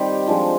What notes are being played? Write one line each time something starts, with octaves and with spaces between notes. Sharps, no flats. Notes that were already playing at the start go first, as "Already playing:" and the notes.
Already playing: D#3 G3 C4 G4
F3 G#3 D4 F4